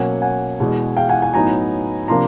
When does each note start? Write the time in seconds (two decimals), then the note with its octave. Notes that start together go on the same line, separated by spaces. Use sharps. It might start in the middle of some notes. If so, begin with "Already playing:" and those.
Already playing: B2 F#3 A#3 C#4 F#5 G#5
0.22 F#5 G#5
0.60 E2 B2 G#3
0.97 F5 G5
1.09 F#5 G#5
1.22 F#5 G#5
1.34 A2 F#3 B3 D#4 G#5 A#5
2.08 C3 F3 A#3 D4 A#5 C6